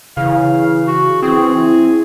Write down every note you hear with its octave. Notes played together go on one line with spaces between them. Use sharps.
C#3 E3 F5
F#4
E3 C4 G#4
E4